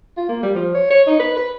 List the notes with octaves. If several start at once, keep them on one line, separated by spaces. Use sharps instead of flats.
F4
A#3
G3
F3
C#5
C#5
D#4
B4
B4